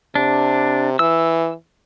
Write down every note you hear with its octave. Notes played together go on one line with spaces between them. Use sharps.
C3 D4
E3 E6